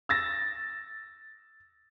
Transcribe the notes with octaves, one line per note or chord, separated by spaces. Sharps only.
E6 A6 A#6